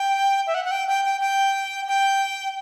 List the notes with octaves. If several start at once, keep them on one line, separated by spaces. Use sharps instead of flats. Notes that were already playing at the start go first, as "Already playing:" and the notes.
Already playing: G5
E5
F#5
F#5
G5
G5
G5
G5
G5